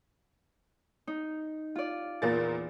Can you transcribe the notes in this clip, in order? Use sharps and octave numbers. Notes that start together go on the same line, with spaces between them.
D#4
F4 D5
E2 A#2 A#3 A6